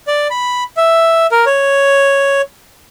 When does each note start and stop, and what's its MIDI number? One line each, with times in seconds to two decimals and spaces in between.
0.07 0.28 74
0.31 0.64 83
0.77 1.27 76
1.32 1.45 70
1.46 2.41 73